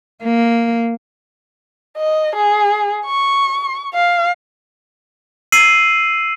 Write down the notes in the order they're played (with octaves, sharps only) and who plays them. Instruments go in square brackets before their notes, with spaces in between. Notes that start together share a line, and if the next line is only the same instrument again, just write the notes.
[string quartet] A#3
[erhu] D#5
G#4
C#6
F5
[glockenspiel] E6 C7 D#7 F#7